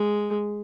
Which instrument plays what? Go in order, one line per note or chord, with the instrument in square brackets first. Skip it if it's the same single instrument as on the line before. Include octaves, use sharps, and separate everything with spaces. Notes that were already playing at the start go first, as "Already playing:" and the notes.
Already playing: [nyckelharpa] G#3